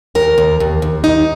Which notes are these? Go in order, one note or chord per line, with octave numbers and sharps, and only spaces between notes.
D#2 A#4
D#2
D#2
D#2
D#4